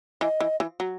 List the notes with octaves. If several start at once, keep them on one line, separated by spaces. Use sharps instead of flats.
E3 D#5
E3
E3
F#3